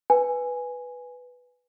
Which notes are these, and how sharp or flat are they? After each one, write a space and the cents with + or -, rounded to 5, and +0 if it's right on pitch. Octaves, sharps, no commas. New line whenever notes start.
B4 +0 G#5 +0